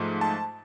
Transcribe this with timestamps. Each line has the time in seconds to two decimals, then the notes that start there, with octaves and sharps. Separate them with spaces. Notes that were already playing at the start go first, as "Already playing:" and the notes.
Already playing: G#2 F3 A3
0.21 A5